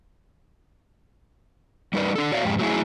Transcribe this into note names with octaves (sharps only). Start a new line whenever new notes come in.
G3 D#4 A#4 B4 D5
D4 A4
F#4 C#5 D5 F5
F2 G#2 G#3 G4
F#3 A3 E4 G#4